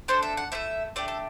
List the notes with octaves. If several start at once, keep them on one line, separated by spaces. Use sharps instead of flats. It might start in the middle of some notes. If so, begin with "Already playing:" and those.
D4 A4 C5
E5
F#5
A3 C4 E4 E5
A3 D4 G4 D5
A4